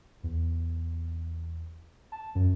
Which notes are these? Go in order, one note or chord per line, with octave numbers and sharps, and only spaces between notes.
E2
A5
F#2